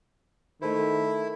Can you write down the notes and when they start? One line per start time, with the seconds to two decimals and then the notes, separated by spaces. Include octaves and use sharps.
0.62 D#3 A3 E4 C5